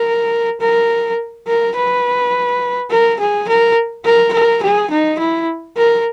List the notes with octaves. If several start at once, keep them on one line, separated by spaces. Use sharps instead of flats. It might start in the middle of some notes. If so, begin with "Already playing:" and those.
Already playing: A#4
A#4
A#4
B4
A#4
G#4
A#4
A#4
A#4
G#4
D#4
E4
A#4